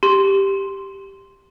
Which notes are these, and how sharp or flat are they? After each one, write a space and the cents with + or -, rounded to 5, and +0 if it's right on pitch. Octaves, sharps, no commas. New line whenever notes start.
G4 +0 C6 +0